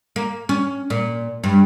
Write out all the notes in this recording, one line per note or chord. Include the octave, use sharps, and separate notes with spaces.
A#3
C#4
A#2
G2